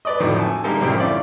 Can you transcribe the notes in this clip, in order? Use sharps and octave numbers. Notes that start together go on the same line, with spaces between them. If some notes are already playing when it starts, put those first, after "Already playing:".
B4 D5 D#5
F2 A2 D3 D#3 F3 F#3
G#5 A5
D3 G3 G#3 A#3 D#4 G4
C2 F#2 A2 F3 G5
D3 C#4 E4 F4 D5